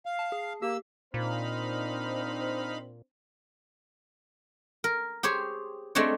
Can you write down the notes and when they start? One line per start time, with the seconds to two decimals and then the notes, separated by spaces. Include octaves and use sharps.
0.06 F5
0.19 A5
0.32 G#4
0.62 A#3 G4 E6
1.14 A#2 C4 D4 D#4 C5 F5 B5
4.84 A#4
5.23 G4 G#4 C5 C#5
5.95 G#3 A3 C4 D4 C#5